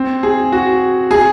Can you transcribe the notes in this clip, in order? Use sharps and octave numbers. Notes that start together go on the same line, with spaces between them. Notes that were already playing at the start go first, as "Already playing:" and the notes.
Already playing: C4
G#4
F#4
G#4